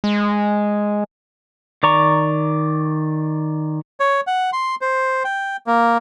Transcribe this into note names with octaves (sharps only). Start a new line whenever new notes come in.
G#3
D#3 D5 A#5 C#6
C#5
F#5
C6
C5
G5
A#3